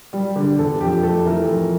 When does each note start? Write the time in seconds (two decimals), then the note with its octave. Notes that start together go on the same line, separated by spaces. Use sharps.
0.13 G3
0.36 D3 G4
0.59 E2 A4
0.81 F2 G4
1.03 A3 A4
1.26 E3 A#4
1.49 F2